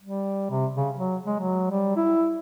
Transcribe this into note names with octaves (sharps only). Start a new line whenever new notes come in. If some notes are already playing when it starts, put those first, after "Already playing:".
G3
C3
C#3
F#3
G#3
F#3
G3
E4